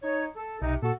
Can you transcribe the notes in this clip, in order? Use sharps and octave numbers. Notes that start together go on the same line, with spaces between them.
D#4 C#5
A4
B1 C3 D#4
A#2 F#4 A4